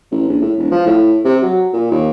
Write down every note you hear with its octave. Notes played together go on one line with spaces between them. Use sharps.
A1
A#1
A2
E1
F3
A2
C3
F#3
A#2
D#2